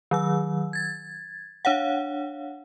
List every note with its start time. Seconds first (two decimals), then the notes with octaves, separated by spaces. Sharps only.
0.11 D#3 F#3 E6
0.73 G#6 A6
1.65 D4 C#5 F5 F#5